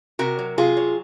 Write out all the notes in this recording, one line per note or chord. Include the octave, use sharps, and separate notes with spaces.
C3 F#4 A#4
F#3
C3 F4 G#4
F#3